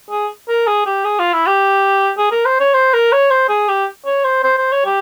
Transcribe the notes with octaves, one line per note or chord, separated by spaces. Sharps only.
G#4
A#4
G#4
G4
G#4
F4
E4
G4
G#4
A#4
C5
C#5
C5
A#4
C#5
C5
G#4
G4
C#5
C5
C5
C5
C#5
G4